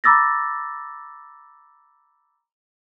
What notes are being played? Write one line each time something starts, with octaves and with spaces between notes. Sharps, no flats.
A#5 B5 D6 E6 A6 A#6